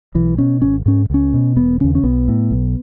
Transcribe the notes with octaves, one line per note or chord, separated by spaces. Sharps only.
B1 E3
B2 C#4
G#1 C#4
G#2 C#4
C#2 C#4
B2
E1 B3
D#2 C#3 C#4
C#4
B1 B3
A2
B1